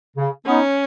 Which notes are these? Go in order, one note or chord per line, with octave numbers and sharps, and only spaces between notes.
C#3
B3 C#4 D#4